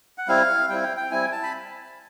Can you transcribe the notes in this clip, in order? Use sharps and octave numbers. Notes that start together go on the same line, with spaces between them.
F#5
G3 C4 E4 F5
G3 C4 E4 G5
G5
G5
G3 C4 E4 G#5
A5
B5